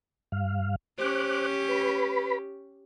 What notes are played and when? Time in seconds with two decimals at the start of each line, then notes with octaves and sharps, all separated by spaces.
0.32 G2 F5
0.98 C#4 G4 C5 D6 F#6
1.69 B4 B5